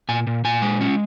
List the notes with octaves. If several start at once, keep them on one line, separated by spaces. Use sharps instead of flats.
A#2 G#5
A#2
A#2 G#5
G#3
C#4